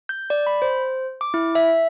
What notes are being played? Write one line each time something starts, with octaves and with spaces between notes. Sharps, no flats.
G6
D5
B5
C5
D6
E4
E5